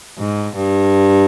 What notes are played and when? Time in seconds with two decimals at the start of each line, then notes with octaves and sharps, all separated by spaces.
0.19 G#2
0.56 G2